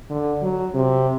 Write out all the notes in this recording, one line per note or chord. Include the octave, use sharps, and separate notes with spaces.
D3
F#3
C3